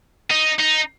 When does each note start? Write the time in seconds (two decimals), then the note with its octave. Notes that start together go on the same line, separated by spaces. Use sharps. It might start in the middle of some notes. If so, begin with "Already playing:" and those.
0.30 D#4
0.59 D#4